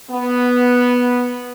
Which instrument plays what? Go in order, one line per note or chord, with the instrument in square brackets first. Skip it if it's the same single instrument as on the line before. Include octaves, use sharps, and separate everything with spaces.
[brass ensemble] B3